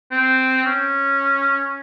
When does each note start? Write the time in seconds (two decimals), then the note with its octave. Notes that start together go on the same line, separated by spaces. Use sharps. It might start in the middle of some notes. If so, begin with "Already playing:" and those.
0.11 C4
0.65 C#4